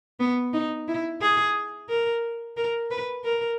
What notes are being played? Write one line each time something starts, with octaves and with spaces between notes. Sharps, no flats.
B3
D#4
E4
G#4
A#4
A#4
B4
A#4